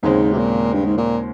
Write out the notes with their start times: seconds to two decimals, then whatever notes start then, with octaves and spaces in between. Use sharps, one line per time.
0.03 D#2 G#2 C#3 G#3 C4
0.33 C3
0.38 A#2
0.73 G2
0.85 G#2
0.98 A#2